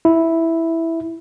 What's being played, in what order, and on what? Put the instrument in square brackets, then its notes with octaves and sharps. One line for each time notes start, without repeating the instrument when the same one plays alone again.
[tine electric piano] E4